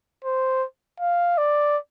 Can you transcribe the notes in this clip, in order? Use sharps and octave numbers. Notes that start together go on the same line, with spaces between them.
C5
F5
D5